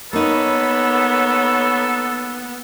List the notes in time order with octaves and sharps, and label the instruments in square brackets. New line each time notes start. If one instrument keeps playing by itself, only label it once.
[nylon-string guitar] A#3 D#4 [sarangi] B3 [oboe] A4 [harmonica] C#5 A#5 B5